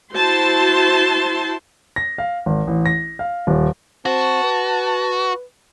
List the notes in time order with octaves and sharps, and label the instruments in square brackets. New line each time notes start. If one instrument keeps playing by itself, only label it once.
[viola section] E4 F#4 C5 A5 C6
[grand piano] A#6
F5
G#1
A1
A#6
F5
D#1
[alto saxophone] C4 [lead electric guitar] F#4 [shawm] A5
[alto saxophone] B4